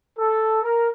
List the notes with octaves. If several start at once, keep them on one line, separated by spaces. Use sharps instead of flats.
A4
A#4